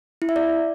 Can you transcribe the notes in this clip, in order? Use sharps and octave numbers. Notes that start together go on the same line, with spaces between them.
E4
E5
D5